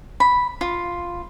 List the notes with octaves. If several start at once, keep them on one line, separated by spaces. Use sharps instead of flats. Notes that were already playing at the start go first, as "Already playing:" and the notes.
B5
F4